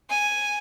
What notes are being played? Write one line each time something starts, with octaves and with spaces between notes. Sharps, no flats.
G#5